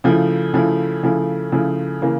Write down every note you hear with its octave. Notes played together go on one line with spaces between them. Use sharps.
C#3 F3 A3 E4
C#3 F3 A3 E4
C#3 F3 A3 E4
C#3 F3 A3 E4
C#3 E3 A#3